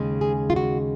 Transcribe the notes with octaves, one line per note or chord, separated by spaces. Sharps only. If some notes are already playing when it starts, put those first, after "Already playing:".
Already playing: D#2 C#3 G#3
G#4
F4
F#4